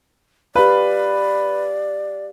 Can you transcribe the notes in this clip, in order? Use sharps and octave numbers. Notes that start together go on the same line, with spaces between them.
G4 B4 D5 F5